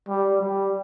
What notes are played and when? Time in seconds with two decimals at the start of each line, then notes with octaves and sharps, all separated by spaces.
0.08 G3
0.41 G3